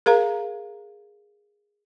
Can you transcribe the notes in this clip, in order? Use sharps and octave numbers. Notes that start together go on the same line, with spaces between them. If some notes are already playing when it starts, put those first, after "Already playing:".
G#4 A#4 F5 A#5